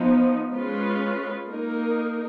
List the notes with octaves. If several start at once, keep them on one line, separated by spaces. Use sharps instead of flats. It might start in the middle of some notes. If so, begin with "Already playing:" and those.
Already playing: F3 B3 D#4
G#3 C#4 F4 B4
A#3 D#4 A#4